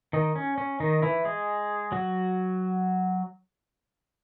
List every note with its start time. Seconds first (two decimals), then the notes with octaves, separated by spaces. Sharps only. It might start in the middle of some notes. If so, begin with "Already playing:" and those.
0.13 D#3 D#4
0.36 C#4
0.58 C#4
0.80 D#3 D#4
1.02 E3 E4
1.25 G#3 G#4
1.92 F#3 F#4